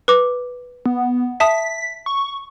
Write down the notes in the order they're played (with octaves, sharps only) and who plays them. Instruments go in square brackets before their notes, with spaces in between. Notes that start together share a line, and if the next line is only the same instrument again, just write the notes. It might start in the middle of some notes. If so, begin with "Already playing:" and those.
[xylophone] B4 D6
[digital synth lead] B3
[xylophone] E5 A5 D#6 [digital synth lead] B6
[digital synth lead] C#6